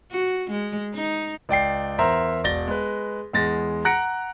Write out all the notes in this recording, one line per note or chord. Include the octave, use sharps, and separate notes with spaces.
F#4
G#3
D#4
C#2 D5 G5 C7
E2 A#4 C5 E5 A#5 C6
E1 D5 A6 A#6 G7
G#3 B4
E2 G#3 A6 A#6
F#5 A#5 F#6 A#6 C#7 D7